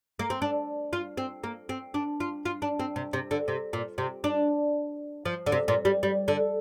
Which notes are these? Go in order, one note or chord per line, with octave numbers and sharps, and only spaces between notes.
A#3
C4
D4
F4
C4
A#3
C4
D4
F4
F4
D4
C4
C3
C3
D3
C3
A#2
C3
D4
F3
D3
C3
A#2
G3
G3
D3